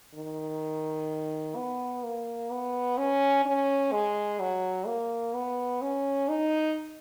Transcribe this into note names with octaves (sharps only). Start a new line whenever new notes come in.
D#3
B3
A#3
B3
C#4
C#4
G#3
F#3
A#3
B3
C#4
D#4